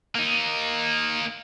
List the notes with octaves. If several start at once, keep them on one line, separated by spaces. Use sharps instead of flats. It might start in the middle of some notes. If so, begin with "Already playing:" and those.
A#3 D#4